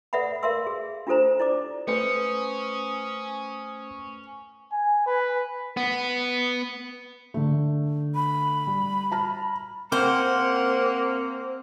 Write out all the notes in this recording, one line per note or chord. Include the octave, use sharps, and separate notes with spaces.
A4 B4 D5 E5 F#5 B5
A#4 B4 E5 F5 C6 E6
G#4
D4 F4 G4 A4 C5 A#5
E4 D5 D6
A3 C#4 B4 C5 D#6 C#7
G#5
B4
B3
D3 A3
B5
G3
A5 A#5 F6
A#3 C4 C5 F#5